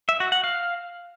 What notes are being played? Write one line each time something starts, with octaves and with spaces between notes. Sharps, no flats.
E5
F#4
F#5
F5